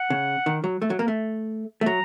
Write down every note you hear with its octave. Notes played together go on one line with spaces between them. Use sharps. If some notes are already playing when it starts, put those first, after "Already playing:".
Already playing: F#5
C#3
D#3
F#3
A3
F#3
A#3
A3
A3
F#3 A#5